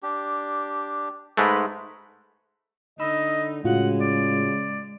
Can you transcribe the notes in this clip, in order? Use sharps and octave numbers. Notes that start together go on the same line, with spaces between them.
D4 G4
G#2 G#3 A3 B4 B5
D3 D#4 D#5 B5 E6
A2 C#3 G#3 F4 F#4 F#5
D5